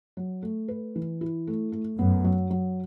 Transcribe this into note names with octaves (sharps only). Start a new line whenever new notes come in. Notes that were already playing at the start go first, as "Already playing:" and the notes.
F#3
A3
B4
E3
E4
A3
A3
F#2 B3
F#3
F#3